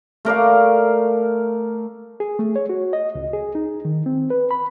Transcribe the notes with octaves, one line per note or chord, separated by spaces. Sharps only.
A3 A#4 D5 F5
G#4
A3
C#5
F#4
D#5
C#2
G#4
D#4
D#3
C4
B4
B5